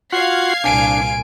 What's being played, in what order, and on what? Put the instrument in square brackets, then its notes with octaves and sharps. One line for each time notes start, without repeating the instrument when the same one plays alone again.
[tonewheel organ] F4 F#4 F#5 [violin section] F5 G#6 C7
[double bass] C2 A#2 [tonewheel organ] D4 [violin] G#5 D7